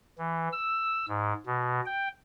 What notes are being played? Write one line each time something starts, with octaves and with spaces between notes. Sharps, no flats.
E3
E6
G#2
B2
G5